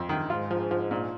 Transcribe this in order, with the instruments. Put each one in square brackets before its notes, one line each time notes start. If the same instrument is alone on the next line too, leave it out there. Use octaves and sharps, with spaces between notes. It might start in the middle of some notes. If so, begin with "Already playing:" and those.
Already playing: [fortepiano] F2
D#3
[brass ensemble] G#2 [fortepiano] F4
[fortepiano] F3
F3
A#2